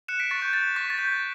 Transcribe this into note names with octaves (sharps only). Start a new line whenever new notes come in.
F#6 C#7 E7
B6 D7
C#6 A6
G6
G6 A6
C#6 B6
A6
G6 B6